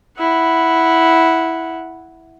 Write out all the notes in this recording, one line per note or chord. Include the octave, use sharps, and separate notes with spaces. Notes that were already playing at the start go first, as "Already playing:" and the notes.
E4 F#5